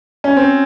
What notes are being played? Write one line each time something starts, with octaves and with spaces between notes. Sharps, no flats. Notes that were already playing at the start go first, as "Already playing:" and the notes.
C#4
C4